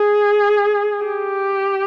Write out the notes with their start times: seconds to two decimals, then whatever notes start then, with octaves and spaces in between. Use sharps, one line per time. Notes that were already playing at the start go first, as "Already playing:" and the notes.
Already playing: G#4
1.04 G4